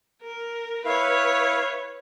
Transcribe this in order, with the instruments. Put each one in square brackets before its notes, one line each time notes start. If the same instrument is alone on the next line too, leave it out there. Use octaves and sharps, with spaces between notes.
[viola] A#4
[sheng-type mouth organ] E4 F5 [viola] B4 C#5